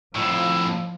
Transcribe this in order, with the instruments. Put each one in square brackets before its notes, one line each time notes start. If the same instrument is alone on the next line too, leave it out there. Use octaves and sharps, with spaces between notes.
[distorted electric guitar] F2 A2 [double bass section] F3 [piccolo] E6